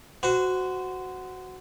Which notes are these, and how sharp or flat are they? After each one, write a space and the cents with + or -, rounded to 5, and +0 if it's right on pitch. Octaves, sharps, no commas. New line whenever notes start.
F#4 +0 C5 -25